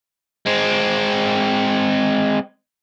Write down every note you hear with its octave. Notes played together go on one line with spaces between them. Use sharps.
G#3 C4